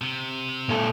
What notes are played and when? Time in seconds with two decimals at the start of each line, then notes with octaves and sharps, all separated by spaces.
0.02 C3
0.69 A#2 A4